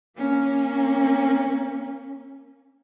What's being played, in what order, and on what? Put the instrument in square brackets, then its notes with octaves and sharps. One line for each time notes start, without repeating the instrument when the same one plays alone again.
[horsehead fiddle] A#3 C#4